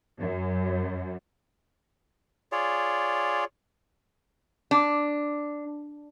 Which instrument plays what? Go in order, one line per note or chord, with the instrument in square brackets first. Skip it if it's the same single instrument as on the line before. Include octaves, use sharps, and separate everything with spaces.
[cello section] F#2
[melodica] F4 G#4 C#5 D5
[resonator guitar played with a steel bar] D4